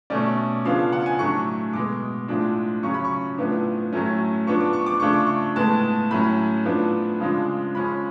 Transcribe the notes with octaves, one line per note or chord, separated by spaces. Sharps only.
B2 A3 C#4 D5
C#3 F3 B3 D4 F5
F5
F#5
G#5
A2 F#3 A3 D4 C#6
B2 G#3 B3 D6
A2 F3 G#3 D4
C#3 F#3 C#4 C#6
B5
C#6
A2 F3 B3 D4
A2 F#3 A3 C#4
F3 B3 D4 C#6
D6
C#6
D6
C#3 F3 A3 D4 C#6
D6
C#6
A2 G#3 B3 A5
A2 F#3 C#4 B5
A2 F3 B3 D4
C#3 F3 G#3 D4
F3 G#3 C#4 B5